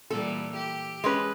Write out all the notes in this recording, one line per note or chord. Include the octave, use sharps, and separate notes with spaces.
A#2 E3 G3 A4
G4
G#3 C#4 B4